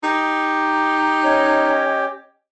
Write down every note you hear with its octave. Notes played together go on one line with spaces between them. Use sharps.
D#4 G4
C#4 C#5 D#5